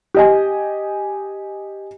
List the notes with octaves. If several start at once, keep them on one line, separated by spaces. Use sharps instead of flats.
G4 D#5 G#5